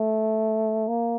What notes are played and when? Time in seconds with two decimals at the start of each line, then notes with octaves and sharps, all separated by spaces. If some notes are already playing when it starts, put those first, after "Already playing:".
Already playing: A3
0.87 A#3